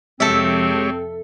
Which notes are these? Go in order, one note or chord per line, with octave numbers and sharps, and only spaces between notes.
F2 C3 G#3 C4 G4 A4 C#5 E5